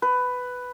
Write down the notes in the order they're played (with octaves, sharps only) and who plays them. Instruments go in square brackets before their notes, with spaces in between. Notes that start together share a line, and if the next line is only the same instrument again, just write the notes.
[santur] B4